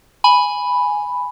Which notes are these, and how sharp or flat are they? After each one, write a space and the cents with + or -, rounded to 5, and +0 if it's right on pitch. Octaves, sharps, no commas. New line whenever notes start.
G#5 +0 B5 +0